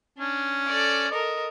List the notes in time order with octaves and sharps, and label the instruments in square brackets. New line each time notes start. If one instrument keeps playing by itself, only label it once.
[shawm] C#4 [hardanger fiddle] D4
[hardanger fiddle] A4 D5
[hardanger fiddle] A4 A#4 [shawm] D#5